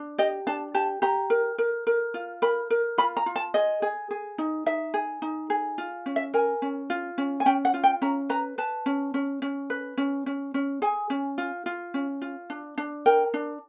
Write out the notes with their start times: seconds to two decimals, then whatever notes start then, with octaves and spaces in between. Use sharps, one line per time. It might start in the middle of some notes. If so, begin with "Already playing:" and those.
Already playing: D4
0.18 G4 D#5
0.47 D4 A5
0.74 G4 A5
1.02 G4 A#5
1.30 A#4
1.58 A#4
1.87 A#4
2.14 F4
2.42 A#4 B5
2.70 A#4
2.98 F4 B5
3.17 A#5
3.26 F4
3.36 A5
3.54 G#4 D#5
3.82 G#4
4.11 G#4
4.38 D#4
4.66 D#4 E5
4.94 G#4
5.22 D#4
5.50 G#4
5.78 F4
6.06 C#4
6.16 E5
6.34 A#4 G#5
6.62 C#4
6.90 F4
7.18 C#4
7.40 G#5
7.46 C#4 G5
7.65 F#5
7.74 F4
7.84 G5
8.02 C#4 A#5
8.29 B4 A#5
8.58 B4 A5
8.86 C#4
9.14 C#4
9.42 C#4
9.70 B4
9.98 C#4
10.26 C#4
10.54 C#4
10.82 G#4 G#5
11.10 C#4
11.38 F4
11.66 F4
11.94 C#4
12.22 F4
12.50 D4
12.78 D4
13.06 A#4 G5
13.34 D4